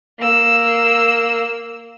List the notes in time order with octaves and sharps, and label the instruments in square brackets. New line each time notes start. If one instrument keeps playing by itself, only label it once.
[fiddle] A#3 E6